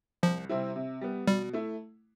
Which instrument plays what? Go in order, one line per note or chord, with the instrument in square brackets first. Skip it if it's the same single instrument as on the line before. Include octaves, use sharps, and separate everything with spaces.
[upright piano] C2 [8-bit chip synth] F3
[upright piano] C3 G3 C4 E4
C3
G3 B3
[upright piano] B2 [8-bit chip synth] G3
[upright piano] A3 E4